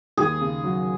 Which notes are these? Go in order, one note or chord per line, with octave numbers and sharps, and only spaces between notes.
D#2 G#4
C#3
F#3